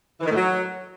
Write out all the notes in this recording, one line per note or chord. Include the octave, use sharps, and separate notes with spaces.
E3
D#3
A2
F#3